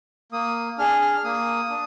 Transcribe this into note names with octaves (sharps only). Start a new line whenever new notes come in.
A#3 D#6
D4 G#4 F6
F6
A#3 D#6
D4